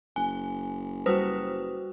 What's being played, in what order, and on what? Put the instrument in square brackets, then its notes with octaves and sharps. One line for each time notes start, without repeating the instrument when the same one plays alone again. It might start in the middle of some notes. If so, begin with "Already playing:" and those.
[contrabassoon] F#1 [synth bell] G#5
[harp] G3 F#4 [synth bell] B4 C5 D#6